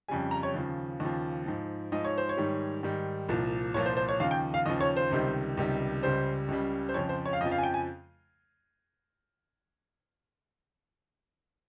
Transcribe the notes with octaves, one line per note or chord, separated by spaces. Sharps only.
F2 C#3 G3 G#5
A#5
C#5
D#2 C#3 F3
D#2 C#3 F3
G#2 F3
G#2 F3 D#5
C#5
C5
C#5
G#2 D#3 G3
G#2 D#3 G3
C2 A#2 F3
C2 A#2 F3 C#5
C5
C5
C#5
D#2 C#3 F3 F5
G5
F5
D#2 C#3 F3 D#5
C#5
C5
C#2 C3 D#3 G3
C#2 C3 D#3 G3
C#2 C#3 G3 C5
C#2 C#3 G3
C5
F2 C#3 F3 C#5
C5
C#5
F5
F2 C#3 F3 D#5
F5
G#5
G5
G#5